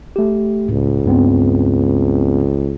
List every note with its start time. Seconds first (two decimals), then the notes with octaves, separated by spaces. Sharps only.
0.16 A3 G4
0.68 C#2 A2
1.06 G2 B3 C4